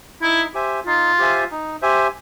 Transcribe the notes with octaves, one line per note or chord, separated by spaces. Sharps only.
D#4 E4
G4 C5 E5 G#5
D#4 F4
G4 C5 E5 G#5
D#4
G4 C5 E5 G#5